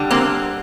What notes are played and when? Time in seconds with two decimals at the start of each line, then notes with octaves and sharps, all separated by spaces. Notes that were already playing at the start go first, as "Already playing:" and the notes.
Already playing: D3 G3
0.11 A#3 C4